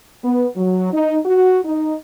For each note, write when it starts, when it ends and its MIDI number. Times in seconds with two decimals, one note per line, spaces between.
0.24 0.46 59
0.56 0.91 54
0.93 1.17 63
1.25 1.60 66
1.65 1.93 63